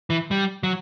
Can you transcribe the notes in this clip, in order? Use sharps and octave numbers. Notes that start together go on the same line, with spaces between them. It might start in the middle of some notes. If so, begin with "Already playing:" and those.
E3
G3
F#3